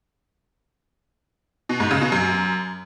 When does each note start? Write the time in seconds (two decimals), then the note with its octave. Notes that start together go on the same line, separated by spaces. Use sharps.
1.69 B2
1.80 G#2
1.91 C#3
2.01 B2
2.12 F#2